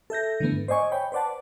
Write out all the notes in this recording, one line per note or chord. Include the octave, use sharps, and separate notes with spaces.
A4 E5 G6 A#6
D3 E3 A3 B3
G#2
C5 D5 D#5 G#5 C#6
C#5 G5 B5
B4 C5 D5 F#5 A5